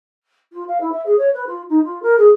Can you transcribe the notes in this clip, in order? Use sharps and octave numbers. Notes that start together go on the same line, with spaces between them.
F4
F5
E4
E5
G#4
C#5
B4
F4
D#4
F4
A#4
G#4